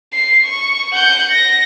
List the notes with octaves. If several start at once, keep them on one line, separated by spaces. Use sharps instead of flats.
C7
C#6
F#5 G6
A#6